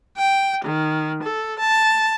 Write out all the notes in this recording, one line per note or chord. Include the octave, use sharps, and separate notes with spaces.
G5
D#3
A4
A5